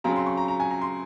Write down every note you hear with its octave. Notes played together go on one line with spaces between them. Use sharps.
C#3 F#3 C4 A#5
C6
C#6
A#5
A#5
G#5
A#5
C6